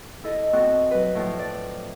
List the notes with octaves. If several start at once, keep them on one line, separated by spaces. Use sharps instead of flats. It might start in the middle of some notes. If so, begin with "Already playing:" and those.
E4 A4 D#5
B2 C4 F#4 A4 F#6
F#3 B4
A2 F3
D5